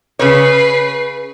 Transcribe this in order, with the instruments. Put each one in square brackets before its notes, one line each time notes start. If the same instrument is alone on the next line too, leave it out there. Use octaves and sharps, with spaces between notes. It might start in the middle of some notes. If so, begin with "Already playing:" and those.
[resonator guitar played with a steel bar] C#3 C#5 [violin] B4 C7